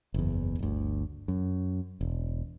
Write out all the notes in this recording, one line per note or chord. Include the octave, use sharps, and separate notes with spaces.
F#1 E2
G1 D2
F#2
E1